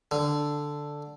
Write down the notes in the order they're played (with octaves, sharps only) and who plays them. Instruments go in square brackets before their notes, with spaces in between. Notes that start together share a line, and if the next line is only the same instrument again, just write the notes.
[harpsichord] D3